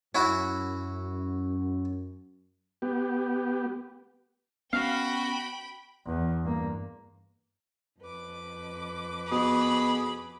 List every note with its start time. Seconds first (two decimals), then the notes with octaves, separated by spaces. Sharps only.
0.15 F#2 C#4 E4 F#4
2.82 B3 G4
4.73 B3 C#4 F#4 F5 G5 B5
6.06 E2
6.43 G2 A#3
7.99 F2 B4 D6
9.31 B2 G#4 B5